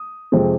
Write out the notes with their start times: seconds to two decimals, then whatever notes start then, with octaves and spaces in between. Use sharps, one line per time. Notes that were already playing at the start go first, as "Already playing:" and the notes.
Already playing: D#6
0.32 F2 C3 G#3 C4